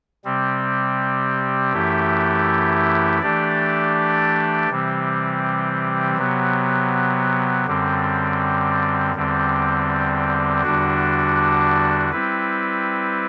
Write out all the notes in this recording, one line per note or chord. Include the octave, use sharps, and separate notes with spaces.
C3 G3 C4
F#2 E3 A3 E4 G4
E3 A3 D4 G4 D5
C3 E3 G3 C4
C3 F#3 B3
F#2 D3 G3 C4
E2 D3 G3 C4
E2 D3 G3 D4 F#4
G3 C4 E4 B4